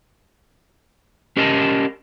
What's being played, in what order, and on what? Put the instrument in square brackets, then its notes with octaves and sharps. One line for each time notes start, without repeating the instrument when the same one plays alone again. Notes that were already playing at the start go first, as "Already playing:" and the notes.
[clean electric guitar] C#4 G4 A#4 D#5 G#5 A5